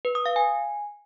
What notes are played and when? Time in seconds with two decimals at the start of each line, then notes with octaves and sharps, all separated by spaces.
0.05 B4
0.15 D#6
0.26 F5
0.36 G#5